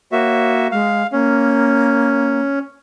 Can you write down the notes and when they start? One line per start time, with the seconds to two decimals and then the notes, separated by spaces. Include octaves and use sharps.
0.12 A#3 F#4 C#5 E5
0.72 G#3 F5
1.12 A#3 C#4